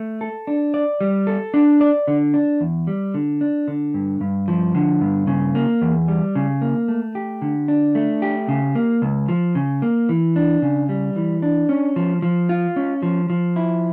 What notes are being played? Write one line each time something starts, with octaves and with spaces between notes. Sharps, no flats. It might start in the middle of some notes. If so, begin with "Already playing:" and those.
Already playing: A3
A4
D4
D5
G3
A4
D4
D5
D3
D4
E2
G3
D3
D4
D3
G2
G2
F3
D3
G2
C#3
A#3
E2
G3
C#3
A#3
A3
G4
D3
D4
A3
G4
C#3
A#3
C#2
F3
C#3
A#3
E3
D4
C#3
G3
E3
D4
C#4
F3
F3
F4
C#4
F3
F3
E4